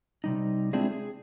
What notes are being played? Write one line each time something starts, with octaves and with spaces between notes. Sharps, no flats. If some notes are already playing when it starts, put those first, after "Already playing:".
C3 G3 D#4
G#3 C4 D4 E4 F4 G#4
G#4